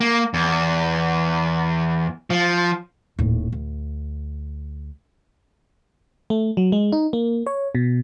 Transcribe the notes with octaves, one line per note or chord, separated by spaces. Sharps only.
A#3
E2
F3
D#1 A2
D2
A3
F#3
G#3
D#4
A#3
C#5
B2